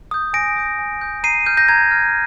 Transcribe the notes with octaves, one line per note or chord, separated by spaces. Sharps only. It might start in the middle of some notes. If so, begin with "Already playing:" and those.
D#6 G6
G#5 A#6 D7
D#6 G6
G#5
D#6 G6
A#5 C7 D#7
F6 G6
G6 A#6
A#5 G#6
F6